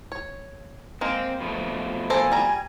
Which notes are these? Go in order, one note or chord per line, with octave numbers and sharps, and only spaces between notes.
C#5
G#3 A#3 C4
B2 F3 A3
A#3 A4 C5 G#5
G3 A#5